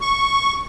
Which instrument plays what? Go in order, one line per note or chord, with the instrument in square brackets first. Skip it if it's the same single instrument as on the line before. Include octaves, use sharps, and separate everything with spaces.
[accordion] C#6